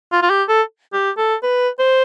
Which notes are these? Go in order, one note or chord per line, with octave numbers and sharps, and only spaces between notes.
F4
F4
G4
A4
G4
A4
B4
C5